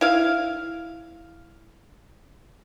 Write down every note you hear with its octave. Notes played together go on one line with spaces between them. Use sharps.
E4 F5